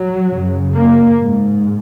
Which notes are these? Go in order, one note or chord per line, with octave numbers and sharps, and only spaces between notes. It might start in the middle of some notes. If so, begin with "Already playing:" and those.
Already playing: F#3
F#2 C#3
A#3
G#2